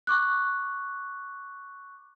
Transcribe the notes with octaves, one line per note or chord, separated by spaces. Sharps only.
C#6 D6 F#6